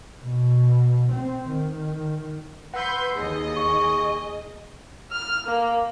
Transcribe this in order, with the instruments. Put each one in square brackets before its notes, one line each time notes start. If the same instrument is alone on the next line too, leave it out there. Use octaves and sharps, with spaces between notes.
[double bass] B2
C4
D#3
[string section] B4 C6 G6 [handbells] F#5 E6
[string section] D#2 [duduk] G#4 [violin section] D#5
[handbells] C#6
[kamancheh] F6
A#3